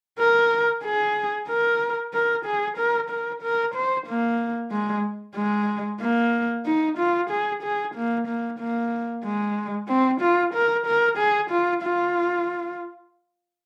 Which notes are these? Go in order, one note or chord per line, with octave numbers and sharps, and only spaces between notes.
A#4
G#4
A#4
A#4
G#4
A#4
A#4
A#4
C5
A#3
G#3
G#3
A#3
D#4
F4
G#4
G#4
A#3
A#3
A#3
G#3
C4
F4
A#4
A#4
G#4
F4
F4